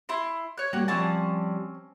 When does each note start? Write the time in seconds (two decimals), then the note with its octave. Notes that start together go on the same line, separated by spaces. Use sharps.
0.09 E4 C6
0.58 C#5 F#6
0.73 G3 A#3 F#4
0.88 F3 G3 C4 C#4 G#5 A5